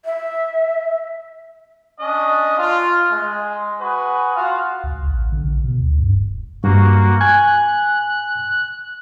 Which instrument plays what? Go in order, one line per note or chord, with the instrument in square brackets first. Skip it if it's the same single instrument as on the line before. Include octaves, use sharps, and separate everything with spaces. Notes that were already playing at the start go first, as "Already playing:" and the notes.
[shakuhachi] E5
[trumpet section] C#4 D4 D#5
F4
G#3
F#4 G#4 B4
F4 F#4 F5
[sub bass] C#2
A1
D3
A#1
B2
D2
G2
F1
[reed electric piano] G2 [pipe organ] A#3 F#4
[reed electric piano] G#5 G#6 [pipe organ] F#6